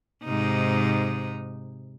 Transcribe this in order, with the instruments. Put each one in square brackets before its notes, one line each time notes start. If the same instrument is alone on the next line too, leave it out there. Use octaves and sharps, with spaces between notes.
[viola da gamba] G#2 C3 D#4